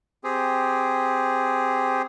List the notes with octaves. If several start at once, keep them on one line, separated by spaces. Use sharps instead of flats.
C4 G4 G#4